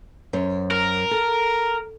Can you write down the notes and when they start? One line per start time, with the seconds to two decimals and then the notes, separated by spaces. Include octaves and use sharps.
0.33 F#2 C5 C#5
0.71 A#4
1.11 A4